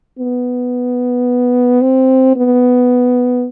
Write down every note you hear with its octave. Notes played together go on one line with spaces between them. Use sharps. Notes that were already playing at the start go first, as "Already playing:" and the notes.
B3
C4
B3